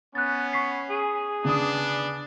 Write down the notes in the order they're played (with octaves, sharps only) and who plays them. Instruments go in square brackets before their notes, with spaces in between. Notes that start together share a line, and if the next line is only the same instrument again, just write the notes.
[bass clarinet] B3 [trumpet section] C#4 [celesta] F#6 A6
[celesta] C#6 B6 C7
[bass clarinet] G#4
[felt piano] C#3 D#6 [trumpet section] B3 D4